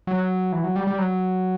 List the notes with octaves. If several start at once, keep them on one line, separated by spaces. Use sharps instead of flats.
F#3
E3
F#3
G3
G3
F#3